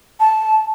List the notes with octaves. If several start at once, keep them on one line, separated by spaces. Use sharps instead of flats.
A5